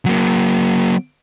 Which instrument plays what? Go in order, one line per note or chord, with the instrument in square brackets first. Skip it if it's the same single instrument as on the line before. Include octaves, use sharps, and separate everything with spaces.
[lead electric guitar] F#3 A#3